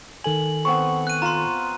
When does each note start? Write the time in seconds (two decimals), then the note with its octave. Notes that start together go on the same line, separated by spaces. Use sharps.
0.24 D#3 A4 G#5 F#7
0.65 B3 C4 C#6
1.07 F#6 D#7
1.22 F4 A#5 C6